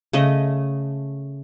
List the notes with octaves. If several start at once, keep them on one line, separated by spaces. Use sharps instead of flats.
C#3 A3 D#5